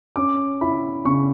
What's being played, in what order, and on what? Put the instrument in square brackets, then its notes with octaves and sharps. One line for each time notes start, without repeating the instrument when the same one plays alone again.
[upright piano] C#4 D6
E4 B5
C#3 C#6